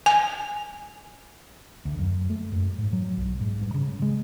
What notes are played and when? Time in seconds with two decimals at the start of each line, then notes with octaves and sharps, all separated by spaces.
0.06 G#5
1.85 D2
1.99 F#2
2.30 A3
2.52 F#2
2.78 G#2
2.93 F#3
3.17 B1
3.40 G#2
3.62 G2
3.74 C#3
4.02 G#3